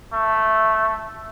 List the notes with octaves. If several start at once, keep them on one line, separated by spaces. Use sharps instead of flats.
A3